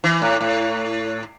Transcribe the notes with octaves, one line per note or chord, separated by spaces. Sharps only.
E3
A2
A2